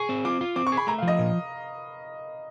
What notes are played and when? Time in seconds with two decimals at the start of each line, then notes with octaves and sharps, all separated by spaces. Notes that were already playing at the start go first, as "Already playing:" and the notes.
Already playing: G#4 C#6
0.09 C4
0.25 F4 D6
0.41 F4
0.56 C4 D6
0.67 C#6
0.72 G#4
0.77 B5
0.87 A3 A#5
0.98 F5
1.03 F3
1.08 D#5
1.19 A#2